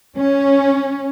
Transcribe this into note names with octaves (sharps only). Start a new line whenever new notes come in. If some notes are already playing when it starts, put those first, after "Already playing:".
C#4